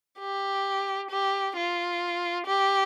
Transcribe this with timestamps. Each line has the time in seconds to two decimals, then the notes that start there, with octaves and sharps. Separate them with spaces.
0.19 G4
1.10 G4
1.56 F4
2.46 G4